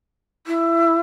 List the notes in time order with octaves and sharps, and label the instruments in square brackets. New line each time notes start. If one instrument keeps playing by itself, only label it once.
[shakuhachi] E4